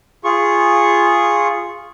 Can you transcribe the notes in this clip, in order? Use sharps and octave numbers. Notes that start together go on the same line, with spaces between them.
F4 G#4 C#6